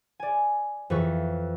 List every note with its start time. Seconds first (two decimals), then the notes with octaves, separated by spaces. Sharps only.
0.20 D5 G#5
0.90 F2 E3 B4 C#6